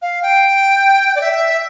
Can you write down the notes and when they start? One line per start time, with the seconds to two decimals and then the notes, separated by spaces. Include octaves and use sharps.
0.02 F5
0.22 G5
1.15 D5
1.21 E5